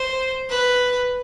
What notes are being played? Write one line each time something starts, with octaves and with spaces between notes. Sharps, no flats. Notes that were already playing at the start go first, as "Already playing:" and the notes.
Already playing: C5
B4